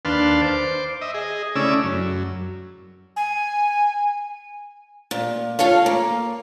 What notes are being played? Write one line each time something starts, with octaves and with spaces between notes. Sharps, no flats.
D#2 D4 B4 F5 A5 C6
C5 D6
D#5 E5
G#4 D#5
C#3 A3 C#4 E4 D5 E6
F#2
G#5
A#2
F4 A4 C#5 F5
A#3